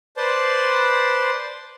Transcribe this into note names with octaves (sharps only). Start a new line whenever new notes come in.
B4 C5 D5 A5 C6